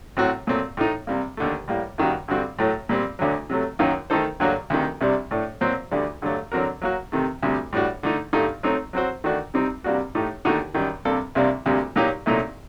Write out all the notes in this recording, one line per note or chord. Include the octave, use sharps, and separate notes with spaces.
A2 F#3 C4 F#4
A#2 F#3 A3 C4
A2 A3 D#4
C3 G3 A#3
D#2 D3 A3
A2 G3 A#3
F#2 D#3 G3 A#3 F#4
G2 D3 G3 C4 F#4
A2 F#3 A3
A#2 G3 C4
D2 D3 F#3
C3 F#3 A3
F#2 D#3 F#3 A#3 D#4
D#3 A3 D#4 A4 C5
G2 D3 F#3 A#3 F#4
D2 C3 D#3
C2 C3 G3 D4
A2 A3 D4
A#2 F#3 C4 F#4 C5
D2 D3 G3 D4
G2 D3 F#3 A3
D3 F#3 C4 F#4 A#4
F#3 A#3 F#4
C3 D#3 A3
D2 C3 G3
A2 G3 D4 F#4
D3 A3 D#4
G2 D3 A3 D#4
F#3 A3 C4 D#4
F#3 C4 F#4 C5
D#3 A3 D4 F#4
C3 G3 C4 D#4
C3 G3 A#3 D4 F#4
A2 A3 D#4 G4
D#2 D3 A3 D#4 F#4
F#2 D#3 G3
C3 G3 A#3 D4 A4
C2 C3 G3 A#3 D4
D2 C3 G3 A#3
A#2 F#3 A#3 D#4 G4
C2 A#2 F#3 A3 D#4